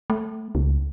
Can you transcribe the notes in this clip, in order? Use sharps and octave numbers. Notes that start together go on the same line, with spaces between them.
A3
C#2